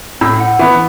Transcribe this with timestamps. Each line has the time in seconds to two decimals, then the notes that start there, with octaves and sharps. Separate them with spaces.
0.21 A2 E6
0.40 F#5
0.59 E3 B3 E5